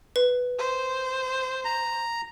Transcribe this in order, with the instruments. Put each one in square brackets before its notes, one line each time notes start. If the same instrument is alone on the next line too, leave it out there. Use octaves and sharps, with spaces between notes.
[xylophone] B4
[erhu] C5
[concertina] A#5